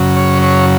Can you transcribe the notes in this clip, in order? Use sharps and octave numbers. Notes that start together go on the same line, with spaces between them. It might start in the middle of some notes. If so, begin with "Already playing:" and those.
Already playing: F#2 C#3 F#3
C#5
C#5